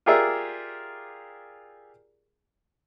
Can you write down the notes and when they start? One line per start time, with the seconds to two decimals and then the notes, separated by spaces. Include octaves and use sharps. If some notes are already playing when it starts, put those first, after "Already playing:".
0.06 F4 G4 G#4 A#4 D5 E5